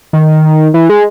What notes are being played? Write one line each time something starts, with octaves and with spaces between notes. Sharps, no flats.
D#3
E3
G#3